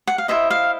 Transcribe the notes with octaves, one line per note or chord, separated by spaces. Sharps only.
F#5
F5
E4 A4 C5 D#5 E5
F5